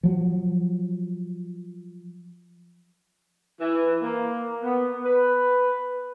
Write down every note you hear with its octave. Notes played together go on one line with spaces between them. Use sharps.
F3 F#3
E3
A#3
B3
B4